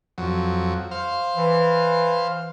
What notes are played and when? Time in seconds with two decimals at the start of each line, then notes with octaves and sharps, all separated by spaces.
0.18 F2 F#3
0.91 C5 F5
1.37 E3